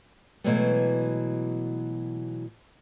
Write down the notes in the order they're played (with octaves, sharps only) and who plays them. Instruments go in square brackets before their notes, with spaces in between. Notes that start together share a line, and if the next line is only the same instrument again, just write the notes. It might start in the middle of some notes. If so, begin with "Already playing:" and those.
[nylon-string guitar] B2 E3 F#3 G#3 A3 B3